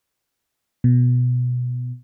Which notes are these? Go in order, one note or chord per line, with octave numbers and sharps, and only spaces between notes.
B2